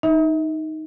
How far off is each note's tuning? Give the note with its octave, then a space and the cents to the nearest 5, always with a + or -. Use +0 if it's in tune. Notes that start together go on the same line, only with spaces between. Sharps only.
D#4 +5 E5 -35